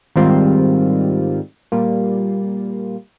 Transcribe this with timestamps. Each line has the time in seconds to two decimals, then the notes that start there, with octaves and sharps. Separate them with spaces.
0.16 G#2 D#3 G3 C4 F4
1.72 A#2 G3 A#3 F4